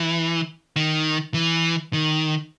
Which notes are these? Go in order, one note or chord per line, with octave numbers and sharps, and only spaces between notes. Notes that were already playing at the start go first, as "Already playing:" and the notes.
Already playing: E3
D#3
E3
D#3